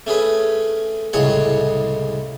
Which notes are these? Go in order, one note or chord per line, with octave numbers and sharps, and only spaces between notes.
A3 C#4 G#4 B4
C2 A2 C#3 G#3 C#5 F#5